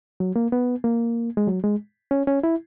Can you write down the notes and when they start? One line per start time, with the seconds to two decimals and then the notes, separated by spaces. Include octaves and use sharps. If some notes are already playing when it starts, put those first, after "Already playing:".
0.20 F#3
0.36 A#3
0.52 B3
0.84 A#3
1.37 G#3
1.47 F#3
1.64 G#3
2.11 C#4
2.27 C#4
2.43 E4